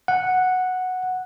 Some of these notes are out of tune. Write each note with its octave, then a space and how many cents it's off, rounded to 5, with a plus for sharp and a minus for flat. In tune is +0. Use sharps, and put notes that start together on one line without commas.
F#5 -5